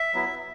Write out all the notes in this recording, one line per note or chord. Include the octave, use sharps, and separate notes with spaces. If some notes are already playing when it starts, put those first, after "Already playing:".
Already playing: E5
F#3 B3 E4